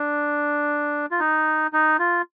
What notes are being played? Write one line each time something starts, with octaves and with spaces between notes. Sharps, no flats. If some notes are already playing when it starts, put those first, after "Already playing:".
Already playing: D4
F4
D#4
D#4
F4